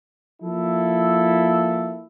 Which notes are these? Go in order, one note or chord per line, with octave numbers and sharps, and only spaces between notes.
F3 A#3 E4 A4